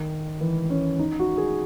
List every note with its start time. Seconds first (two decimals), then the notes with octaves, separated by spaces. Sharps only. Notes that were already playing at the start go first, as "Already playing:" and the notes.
Already playing: D#3
0.41 E3
0.70 C#4
0.99 D#4
1.19 F#4
1.38 G#4